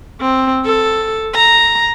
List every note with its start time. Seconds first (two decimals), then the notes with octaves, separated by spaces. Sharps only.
0.21 C4
0.65 A4
1.35 A#5